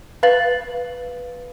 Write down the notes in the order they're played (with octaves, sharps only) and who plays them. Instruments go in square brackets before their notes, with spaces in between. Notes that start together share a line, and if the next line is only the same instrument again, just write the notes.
[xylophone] B4 F5 A6 F#7